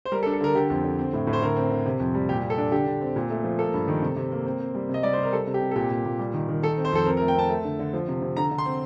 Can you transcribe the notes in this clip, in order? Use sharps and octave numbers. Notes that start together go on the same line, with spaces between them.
C5
G3 A#4
A4
D4
A4
D3 A#4
D3 G4
F2
D3
C4
A2
A2
C5
D3 A#4
C4
D3
C3
F2
G3
A#2 G4
A#2
A4
D4
D3 G4
D3
C4
A#2
A3
F3
A#3 A4
G2
D#3
C3
C3
A#3
C4
C4
G3
C3 D#5
G3 D5
C5
C3 A#4
G3 A4
C3
G4
C3
A4
A#2 G4
A#2
A#2
G3
D#3
D#3
D#3 A4
C4
C5
F2 A4
C4 A#4
A#4
A3
G5
C4 A5
A3
D3
D3
F3
C3
C3
D3 A#5
D3
C6
C4